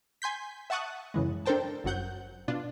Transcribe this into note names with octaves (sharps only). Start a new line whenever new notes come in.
G#5 C6 G6 B6
E5 F#5 A5 C#6 D#6 F#6
F#2 C#3 E3 G#3
D4 A4 A#4 C5 G5 A5
G1 F#2 F#3 F#5 G6
B2 D4 F4